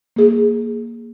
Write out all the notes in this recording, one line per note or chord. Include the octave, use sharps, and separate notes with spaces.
A#3 G#4